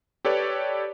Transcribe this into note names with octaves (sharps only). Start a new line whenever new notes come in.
G4 A4 B4 C#5 D5